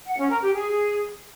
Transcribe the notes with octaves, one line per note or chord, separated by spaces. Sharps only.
F#5
C#4
A#4
G4
G#4